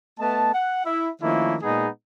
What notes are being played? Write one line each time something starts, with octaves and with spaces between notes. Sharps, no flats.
A3 B3 D#5 A5
F#5
E4 E5
D#3 F3 A3 A#3 C#4 E4
A#2 G#3 B3 D#4 G#4